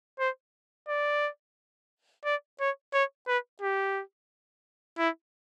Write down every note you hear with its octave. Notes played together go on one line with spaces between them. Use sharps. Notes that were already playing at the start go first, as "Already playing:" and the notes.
C5
D5
D5
C#5
C#5
B4
G4
E4